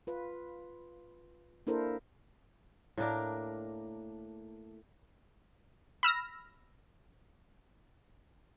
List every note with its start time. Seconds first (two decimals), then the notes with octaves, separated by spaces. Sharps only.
0.07 F4 B4
1.67 A#3 D4 E4 A4 A#4 C5
2.98 A2 A#3 D4 A#4
6.03 B5 E6 F6 A#6